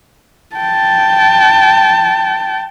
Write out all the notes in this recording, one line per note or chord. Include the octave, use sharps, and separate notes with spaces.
G5 A5